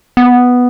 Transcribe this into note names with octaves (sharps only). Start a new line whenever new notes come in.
B3